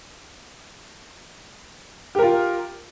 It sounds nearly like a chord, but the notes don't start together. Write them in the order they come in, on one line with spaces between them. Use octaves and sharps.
G4 A#4 F4